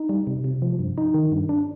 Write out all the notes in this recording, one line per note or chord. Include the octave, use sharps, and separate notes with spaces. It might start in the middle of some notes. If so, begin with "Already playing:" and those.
Already playing: D#4
G3
C3
C3
F3
G2
D#4
D#3
G2
D4